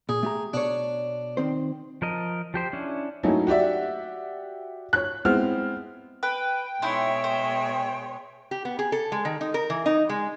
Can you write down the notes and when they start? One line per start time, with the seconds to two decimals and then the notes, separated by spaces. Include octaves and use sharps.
0.09 A#2 G#4
0.23 A3 G4 A#5
0.53 B2 D4 C#5
1.37 D#3 C4 C5
2.02 F3 A#4 D#5
2.54 F3 G4 C5
2.73 C#4 D4 E4
3.23 F#3 A3 A#3 C#4 D#4 E4
3.47 F#4 G4 D5 E5
4.93 C#5 F#6
5.25 G#3 B3 C4 E4 F6
6.23 B4 G5
6.82 B2 G#3 D#4 E4 C#5 E5 C6
7.24 C5
8.51 G4
8.65 B3
8.79 G#4
8.92 A4
9.12 G#3
9.25 D#3
9.41 D#4
9.54 A#4
9.70 E3
9.86 D#4
10.09 G#3